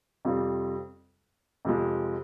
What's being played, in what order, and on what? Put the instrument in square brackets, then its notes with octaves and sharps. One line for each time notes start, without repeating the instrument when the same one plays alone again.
[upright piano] F2 C3 G3 C4 F4
F2 C3 F3 G#3